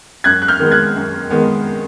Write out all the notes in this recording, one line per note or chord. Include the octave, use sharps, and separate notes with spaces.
F#2 F#6 G#6
F#6
F6 G6
D#3 G#3 B3
F#6 G#6
F#2
D#3 G#3 B3